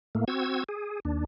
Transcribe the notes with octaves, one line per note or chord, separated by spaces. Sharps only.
A2 A3 A#3
C4 F#4 E6 G#6
G#4
D#2 D4